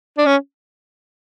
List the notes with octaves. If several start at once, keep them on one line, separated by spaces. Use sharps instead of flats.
D4
C#4